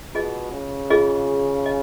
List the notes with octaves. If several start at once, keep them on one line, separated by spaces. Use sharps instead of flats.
B2 F4 G#4 D#5
C#3
F4 G#4 D#5
D#5